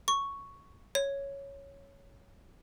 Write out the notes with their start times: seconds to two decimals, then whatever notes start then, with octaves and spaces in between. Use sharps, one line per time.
0.08 C#6
0.95 C#5